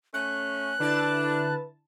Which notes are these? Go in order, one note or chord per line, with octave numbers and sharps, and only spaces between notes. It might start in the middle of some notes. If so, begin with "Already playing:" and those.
A3 C#4 F#6
D3 D4 E4 B4 A5